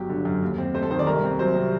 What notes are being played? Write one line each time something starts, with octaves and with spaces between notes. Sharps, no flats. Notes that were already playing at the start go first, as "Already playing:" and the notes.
Already playing: G1 F#3 G4
D3
F#2
D#2
C4
A3 C5
A4
D#3 C5
D5
C2 A#4
C4
F#3 C5
C3